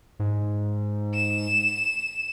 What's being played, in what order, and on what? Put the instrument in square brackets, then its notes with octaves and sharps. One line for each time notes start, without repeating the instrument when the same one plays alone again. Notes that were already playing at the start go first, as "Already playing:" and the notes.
[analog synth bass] G#2
[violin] E7